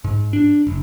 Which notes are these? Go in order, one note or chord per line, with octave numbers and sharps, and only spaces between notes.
G#2
D4
F#1